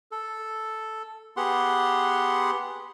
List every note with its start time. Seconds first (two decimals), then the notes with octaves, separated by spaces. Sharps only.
0.12 A4
1.37 B3 G4 G#4 F#5 C6